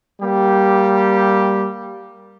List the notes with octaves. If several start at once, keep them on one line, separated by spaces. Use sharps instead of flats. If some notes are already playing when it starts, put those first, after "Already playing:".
G3 A#3 G4